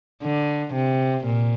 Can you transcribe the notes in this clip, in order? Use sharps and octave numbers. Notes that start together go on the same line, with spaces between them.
D3
C3
A#2